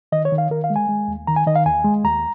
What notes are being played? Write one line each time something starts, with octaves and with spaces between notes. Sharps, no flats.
D#3 D#5
C#5
D#3
F5
D#3 A#4
F5
G#3
G#5
G#3
D#2
D#3 A#5
G#5
D#3 D#5
F5
D#2 G#5
G#3
D#2 A#5